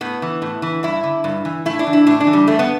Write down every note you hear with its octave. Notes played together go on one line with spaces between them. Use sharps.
A2 B3
E3
A2
E3
G2 E4
D3
G2
E3
A2 E4
D4
E3
E4
A2 D4
D4
E3
G3
G2 A3
B3